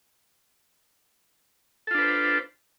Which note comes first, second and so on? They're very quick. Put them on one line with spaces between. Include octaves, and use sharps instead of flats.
A4 F4 D4 B4 C5